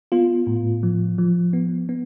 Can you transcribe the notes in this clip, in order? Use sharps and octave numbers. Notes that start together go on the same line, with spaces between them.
B3 F4
A2
F3
F3
B3
B3